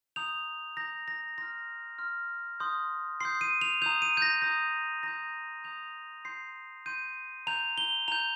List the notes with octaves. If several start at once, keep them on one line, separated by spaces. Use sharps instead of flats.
A#5 D#6 G6 F7
A#5 D#6 G6 A#6
A#6
C6 F6 A#6
C6 F6
C6 D#6 G6
C6 D#6 G6 C7
D#7
F7
A#5 D#6 G6 F7
D#7
G6
A#6
A#5 D#6 G6
A#5 D#6 G6 A#6
A#5 D#6 G6 F7
C6 G6 C7
C6 G6 D#7
A#5 G6 F7
G7
A#5 G6 F7